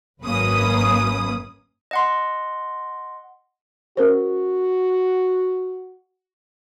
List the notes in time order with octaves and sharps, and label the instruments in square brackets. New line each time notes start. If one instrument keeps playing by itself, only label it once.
[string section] G#1 F#2 A#3 C#4 B4 D#6
[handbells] D#5 F#5 C6
[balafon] C#4 A#4 C5 [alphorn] F#4